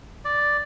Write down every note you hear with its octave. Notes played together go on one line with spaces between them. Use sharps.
D5